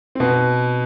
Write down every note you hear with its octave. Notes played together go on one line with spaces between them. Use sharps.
C4
B2 B3